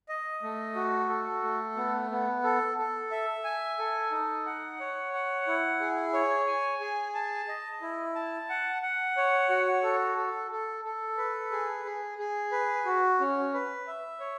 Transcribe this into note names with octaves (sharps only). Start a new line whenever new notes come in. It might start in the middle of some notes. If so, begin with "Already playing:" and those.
D#5
A3
F#4
A4
A3
B3
B3
A4
A4
E5
G#5
A4
D#4
F#5
C#5
F#5
E4
G#4
C#5
G#5
G#4
A5
D#5
E4
A5
F#5
F#5
C#5
F#4
A4
A4
A4
A4
B4
G#4
G#4
G#4
B4
F#4
C#4
B4
E5
C#5